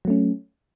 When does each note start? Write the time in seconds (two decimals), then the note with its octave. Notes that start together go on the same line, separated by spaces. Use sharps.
0.05 F#3
0.07 A3
0.10 C#4